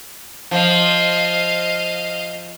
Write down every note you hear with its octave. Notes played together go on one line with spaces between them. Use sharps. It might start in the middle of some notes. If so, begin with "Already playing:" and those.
F3 D#5 F5